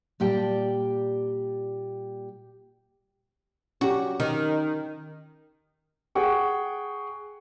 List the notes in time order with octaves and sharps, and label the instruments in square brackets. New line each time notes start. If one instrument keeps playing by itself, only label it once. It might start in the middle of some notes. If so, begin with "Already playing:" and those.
[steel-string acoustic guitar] A#2 G3 G4 D5 G5 A5
[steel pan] C#4 G4 [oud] F#4
[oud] D#3
[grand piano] G#4 F#5 G5 C#6